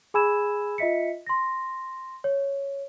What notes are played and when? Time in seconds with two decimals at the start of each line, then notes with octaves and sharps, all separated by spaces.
0.14 G#4 G#5 B5 E6 G#6 E7
0.78 F4 D#5 E5 B6 C#7
1.27 C6 A#6
2.24 C#5